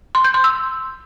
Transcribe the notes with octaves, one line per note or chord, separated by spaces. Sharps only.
C6
G6
C6
E6